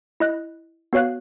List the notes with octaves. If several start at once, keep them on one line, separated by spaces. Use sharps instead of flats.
E4 D#5 F#6
B3 F#4 C#5 F5 F#6